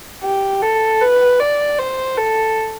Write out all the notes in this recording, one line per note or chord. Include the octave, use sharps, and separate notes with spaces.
G4
A4
B4
D5
C5
A4